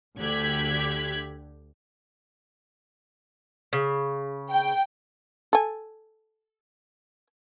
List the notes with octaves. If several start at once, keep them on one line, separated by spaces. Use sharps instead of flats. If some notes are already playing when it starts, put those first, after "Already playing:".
D2 D3 G4 F#6 G#6 B6
C#3
G5
A4 G#5